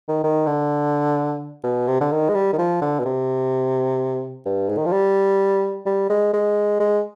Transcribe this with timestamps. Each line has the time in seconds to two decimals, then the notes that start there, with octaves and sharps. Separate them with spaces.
0.08 D#3
0.24 D#3
0.47 D3
1.64 B2
1.88 C3
2.01 D3
2.12 D#3
2.29 G#3
2.35 G3
2.53 D#3
2.58 F3
2.81 D3
2.99 B2
3.05 C3
4.45 G2
4.69 G#2
4.77 D#3
4.86 F3
4.92 G3
5.86 G3
6.10 G#3
6.33 G#3
6.80 G#3